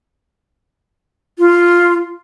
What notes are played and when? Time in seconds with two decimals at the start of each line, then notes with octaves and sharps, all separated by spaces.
1.39 F4